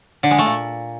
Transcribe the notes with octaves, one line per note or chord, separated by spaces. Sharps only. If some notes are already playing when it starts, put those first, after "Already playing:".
D3
G#3
A3
A#2